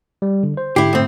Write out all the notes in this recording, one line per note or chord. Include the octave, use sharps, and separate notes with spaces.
G3
D3
C5
G#2 D3 E4 G4 C7
A2 C4